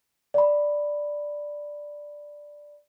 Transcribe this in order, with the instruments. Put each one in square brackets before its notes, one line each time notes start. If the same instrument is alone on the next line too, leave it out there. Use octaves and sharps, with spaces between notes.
[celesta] D5 B5